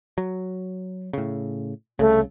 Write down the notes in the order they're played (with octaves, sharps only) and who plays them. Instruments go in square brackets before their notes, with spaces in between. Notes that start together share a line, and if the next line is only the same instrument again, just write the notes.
[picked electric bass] F#3
A2 C#3
[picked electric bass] C2 C#3 [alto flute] A3